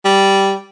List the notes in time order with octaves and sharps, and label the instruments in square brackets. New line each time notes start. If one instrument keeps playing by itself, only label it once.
[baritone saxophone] G3